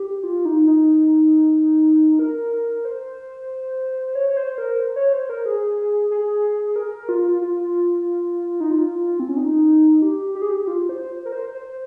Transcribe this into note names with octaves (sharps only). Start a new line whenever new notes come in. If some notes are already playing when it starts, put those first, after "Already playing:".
Already playing: G4
F4
D#4
D#4
A#4
C5
C#5
C#5
C5
A#4
C5
C#5
C5
A#4
G#4
G#4
A#4
F4
F4
D#4
F4
C4
C#4
D#4
G4
G4
G#4
G4
F4
C5
A#4
C5
C5